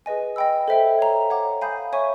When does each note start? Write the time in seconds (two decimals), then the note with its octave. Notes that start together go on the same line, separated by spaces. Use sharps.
0.06 G#4 B4 D#5 G#5
0.36 D#5 G5 B5 E6
0.68 A4 C5 E5 G5
0.99 C#5 F5 A#5
1.30 C#5 F#5 A#5 D6
1.62 F5 G#5 B5 D#6 G6
1.93 C#5 E5 G#5 C#6